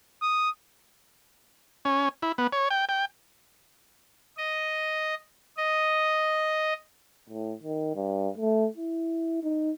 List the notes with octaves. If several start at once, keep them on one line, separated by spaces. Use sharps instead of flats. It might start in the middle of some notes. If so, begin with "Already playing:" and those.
D#6
C#4
E4
B3
C#5
G5
G5
D#5
D#5
A2
D#3
G2
A3
E4
D#4